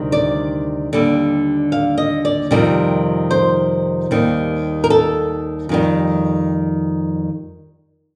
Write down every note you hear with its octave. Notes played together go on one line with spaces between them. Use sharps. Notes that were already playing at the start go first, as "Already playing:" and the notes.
Already playing: D2 C3 D#3 G3
D5
D#2 D3 G3
F5
D#5
D5
F2 C3 D#3 G3
C5
D#2 D#3 G3
A#4
A4
F2 D#3 G3